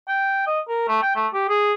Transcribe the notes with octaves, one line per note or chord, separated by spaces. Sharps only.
G5
D#5
A#4
A3
G5
A3
G4
G#4